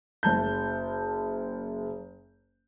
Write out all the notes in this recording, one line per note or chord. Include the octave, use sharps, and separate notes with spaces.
F#1 A5 G6